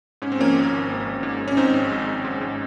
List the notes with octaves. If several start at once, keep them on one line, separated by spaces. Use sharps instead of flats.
G#2 C#4
C4
F3 A#3 C#4
G#1
G#1
G#1
G#1
G#2
G#2
C#4
G#2 C4 D#4
G#1
G#2
G#2
G#2
G#2